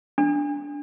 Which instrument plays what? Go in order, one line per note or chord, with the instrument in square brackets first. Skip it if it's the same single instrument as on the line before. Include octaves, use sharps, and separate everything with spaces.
[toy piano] D4